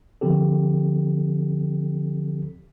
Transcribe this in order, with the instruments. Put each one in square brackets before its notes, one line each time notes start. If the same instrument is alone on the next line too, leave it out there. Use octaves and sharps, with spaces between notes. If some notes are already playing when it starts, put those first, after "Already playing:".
[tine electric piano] D3 F3 C4 G4 A4